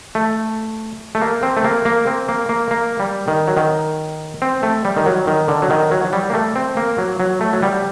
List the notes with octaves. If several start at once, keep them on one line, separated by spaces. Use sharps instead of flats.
A3
A3
A#3
C4
A3
A#3
A#3
C4
A#3
A#3
A#3
G3
D#3
F#3
D#3
C4
A3
G3
D#3
F#3
D#3
D3
F#3
D#3
F#3
F#3
G3
A#3
A3
C4
A#3
F#3
F#3
A3
F#3
G3